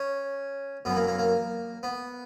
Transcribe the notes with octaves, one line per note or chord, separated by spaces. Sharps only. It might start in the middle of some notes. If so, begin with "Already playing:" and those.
Already playing: C#4
F#2 E3 B3
A#3
A#3
A#3
B3